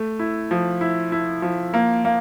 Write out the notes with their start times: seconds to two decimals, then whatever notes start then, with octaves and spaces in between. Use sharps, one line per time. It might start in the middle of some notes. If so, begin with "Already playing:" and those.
Already playing: A3
0.19 E4
0.51 F3
0.81 E4
1.12 E4
1.42 F3
1.74 A#3
2.05 A#3